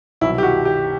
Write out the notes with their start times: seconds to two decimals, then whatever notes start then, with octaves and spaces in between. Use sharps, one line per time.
0.21 C2 B2 F#3 E4
0.38 G4
0.43 F#4
0.65 G4